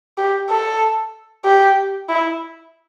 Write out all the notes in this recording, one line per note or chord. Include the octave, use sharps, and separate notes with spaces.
G4
A4
G4
E4